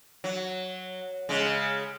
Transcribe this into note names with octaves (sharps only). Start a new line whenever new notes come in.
F#3
C#3 G#3